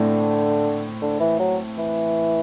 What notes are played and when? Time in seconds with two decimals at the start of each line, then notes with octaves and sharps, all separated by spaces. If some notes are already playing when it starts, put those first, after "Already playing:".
Already playing: A2 D3 A3 C4 E4
1.01 D3
1.20 E3
1.40 F#3
1.78 E3